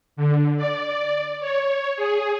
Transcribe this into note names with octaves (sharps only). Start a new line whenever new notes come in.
D3
D5
C#5
G#4